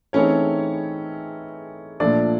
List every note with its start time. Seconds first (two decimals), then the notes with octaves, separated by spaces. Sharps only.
0.13 E3 A3 C4 C#4 D#4 G#4 C#5
2.00 A#2 F3 A3 D4 D5